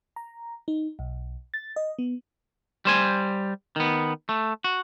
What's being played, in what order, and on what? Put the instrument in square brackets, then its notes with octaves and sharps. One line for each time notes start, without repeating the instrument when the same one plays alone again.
[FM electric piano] A#5
D#4
B1
A6
D#5
B3
[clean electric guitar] G3 C5 G#5
D#3 B3
A3
F#4